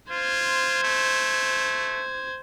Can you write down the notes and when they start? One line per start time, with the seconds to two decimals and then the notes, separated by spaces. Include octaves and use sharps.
0.11 F4 C5 G#6
0.83 A3